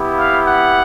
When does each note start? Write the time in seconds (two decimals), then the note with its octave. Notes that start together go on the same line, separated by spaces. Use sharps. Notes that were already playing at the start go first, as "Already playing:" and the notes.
Already playing: B3 E4 G4
0.18 F5
0.49 F#5